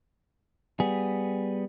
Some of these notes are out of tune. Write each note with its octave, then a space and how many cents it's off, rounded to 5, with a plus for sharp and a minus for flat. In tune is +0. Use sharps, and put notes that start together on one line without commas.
G3 +0 B3 +0 G#4 +0